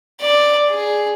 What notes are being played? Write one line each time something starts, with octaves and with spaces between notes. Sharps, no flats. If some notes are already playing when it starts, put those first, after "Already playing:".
D5
G#4